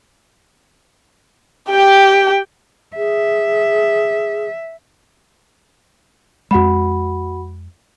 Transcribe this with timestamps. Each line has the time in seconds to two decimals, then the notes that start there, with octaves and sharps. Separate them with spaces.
1.70 G4 G5
2.97 G#4 E5
6.51 F2 G#3 F#4 F#5 B5